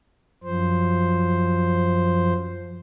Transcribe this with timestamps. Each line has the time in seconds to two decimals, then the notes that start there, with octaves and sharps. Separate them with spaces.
0.44 F#2 F3 C5